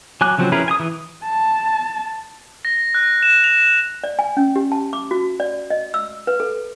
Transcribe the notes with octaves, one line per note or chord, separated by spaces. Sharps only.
F#3 G#5 D6 F#6
C#3 F3 F#3 C4
C#4 E4 G#4 A#4 B4
G#5 D#6
E3
A5
A#6
F#6
E7
F7
D5
G#5
C#4
G4
A5
D6
F#4
D5
D#5
E6
B4
A4